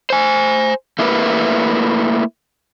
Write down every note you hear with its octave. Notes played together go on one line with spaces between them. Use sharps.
C5 G#5
A3 A#3 E4 G4 A#4 B4